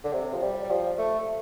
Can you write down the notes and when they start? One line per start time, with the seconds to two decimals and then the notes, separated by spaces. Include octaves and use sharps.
0.04 D3
0.13 C3
0.34 F3
0.42 G3
0.64 G3
0.70 F3
0.99 A3